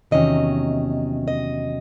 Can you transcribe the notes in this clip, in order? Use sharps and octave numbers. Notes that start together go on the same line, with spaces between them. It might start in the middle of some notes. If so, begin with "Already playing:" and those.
E2 C3 D#3 F#3 C#4 D#5
D#5